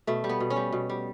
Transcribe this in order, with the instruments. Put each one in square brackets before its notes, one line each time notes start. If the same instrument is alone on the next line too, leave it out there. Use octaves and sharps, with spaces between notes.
[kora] B2 A3
G3
B3
B2
C#4
G3
B2
G3